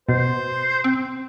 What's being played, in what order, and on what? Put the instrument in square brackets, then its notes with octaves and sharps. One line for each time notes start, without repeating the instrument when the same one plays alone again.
[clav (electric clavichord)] B2 [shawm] C5
[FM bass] C4